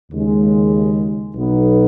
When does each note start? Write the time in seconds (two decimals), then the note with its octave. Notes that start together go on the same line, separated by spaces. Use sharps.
0.12 D#2 C#3 G#3
1.34 B1 B2 B3 D#4